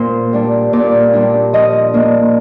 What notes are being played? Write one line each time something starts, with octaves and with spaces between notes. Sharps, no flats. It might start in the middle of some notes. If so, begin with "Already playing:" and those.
Already playing: A#2 C5
G3 D4
A#2 D5
G3 D4
F3 D#5
A#3 D4